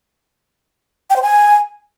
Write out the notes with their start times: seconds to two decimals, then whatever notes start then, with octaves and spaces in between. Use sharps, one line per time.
1.10 G5
1.16 C5
1.22 G#5